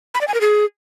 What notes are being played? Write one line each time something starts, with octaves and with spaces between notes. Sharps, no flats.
B5
D5
G#5
A#4
G#4